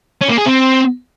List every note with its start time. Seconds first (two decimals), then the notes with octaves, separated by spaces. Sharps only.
0.21 C#4
0.29 A#3
0.38 G#4
0.46 C4